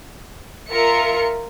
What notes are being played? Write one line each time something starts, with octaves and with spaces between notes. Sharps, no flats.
F4 A#4 E5 C#7